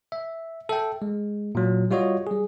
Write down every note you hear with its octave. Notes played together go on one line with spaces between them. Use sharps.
E5
A4 E5 G5
G#3
A#2 F#3
G3 F4 F#4 C#5 D#5
G3 G#4